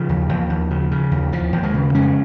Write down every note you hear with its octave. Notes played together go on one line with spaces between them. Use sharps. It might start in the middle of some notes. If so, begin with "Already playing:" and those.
Already playing: C#3 F3
D#2
D#2
D#2
C#3
C#3
D#2
D#2 F3
D#2
D#3 G#3
C#3
F2 G#3 C#4